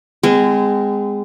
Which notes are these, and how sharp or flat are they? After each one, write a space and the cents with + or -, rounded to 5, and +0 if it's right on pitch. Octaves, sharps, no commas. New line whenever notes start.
G#3 -15 C4 -40